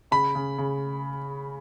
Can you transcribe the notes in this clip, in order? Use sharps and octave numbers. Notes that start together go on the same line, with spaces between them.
C#3 B5
C#3
C#3